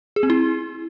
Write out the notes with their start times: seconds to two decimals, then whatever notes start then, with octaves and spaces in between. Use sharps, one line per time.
0.16 G#4
0.23 C4
0.30 E4